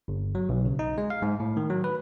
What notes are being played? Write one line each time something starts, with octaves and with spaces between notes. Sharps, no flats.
G1
F#3
B1
C#3
D#4
G#3
F5
G#2
A2
D#3
F#3
B4